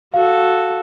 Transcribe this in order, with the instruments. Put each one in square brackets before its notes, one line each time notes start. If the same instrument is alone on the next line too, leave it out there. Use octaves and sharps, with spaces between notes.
[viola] F#4 A4 [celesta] F5